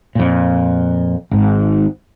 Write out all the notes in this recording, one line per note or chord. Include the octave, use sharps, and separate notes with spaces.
F2 A#2
G#1 G#2